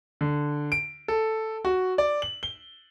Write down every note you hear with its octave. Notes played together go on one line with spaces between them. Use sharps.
D3
D7
A4
F#4
D5
F#7
G7